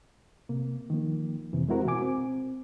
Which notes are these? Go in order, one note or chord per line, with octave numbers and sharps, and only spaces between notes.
C3 A#3
D#3 F3 A#3
F2 C3 E3
G#3 C4 E4 F#4 A#4 C5
B2 F#4 G#5 D6
C4